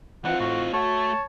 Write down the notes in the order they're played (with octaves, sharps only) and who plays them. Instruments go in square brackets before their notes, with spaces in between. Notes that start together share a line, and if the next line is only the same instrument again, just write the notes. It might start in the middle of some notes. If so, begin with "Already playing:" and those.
[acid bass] E3 [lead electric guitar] C4 D#4 [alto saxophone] F4 [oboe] F#5
[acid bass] A2 [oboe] F#4
[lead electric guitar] A3 [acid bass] F#4 [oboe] C#5 [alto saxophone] A5